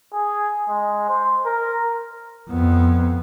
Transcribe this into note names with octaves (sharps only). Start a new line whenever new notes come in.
G#4
G#3
C5
A#4
F2 B3